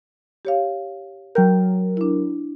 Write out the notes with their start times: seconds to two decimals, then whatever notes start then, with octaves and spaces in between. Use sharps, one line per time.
0.45 G4 C#5 F5
1.35 F#3 A#4 G5 G6
1.97 D4 E4